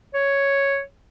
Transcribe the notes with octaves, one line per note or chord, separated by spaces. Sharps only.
C#5